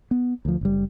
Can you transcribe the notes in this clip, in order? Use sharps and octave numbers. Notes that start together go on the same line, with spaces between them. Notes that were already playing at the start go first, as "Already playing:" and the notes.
B3
D2 F3
F#1 G3